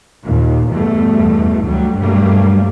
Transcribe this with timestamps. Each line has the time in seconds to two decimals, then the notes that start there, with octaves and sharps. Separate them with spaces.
0.23 D#2 A#2
0.70 E2 G2 B2 A3
1.64 D2 F#3 G3
1.98 G2 B2 F#3 G3 A3 A#3